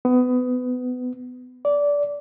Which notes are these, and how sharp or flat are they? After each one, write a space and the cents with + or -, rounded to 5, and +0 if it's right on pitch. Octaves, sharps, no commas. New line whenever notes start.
B3 +25
D5 -20